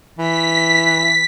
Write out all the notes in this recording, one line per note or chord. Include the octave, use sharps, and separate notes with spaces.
E3 B6